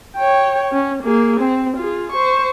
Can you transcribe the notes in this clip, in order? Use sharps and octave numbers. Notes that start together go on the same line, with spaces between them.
C#5 G5
C#4
A#3 G#4
C4
F4 G#4
C5 C#6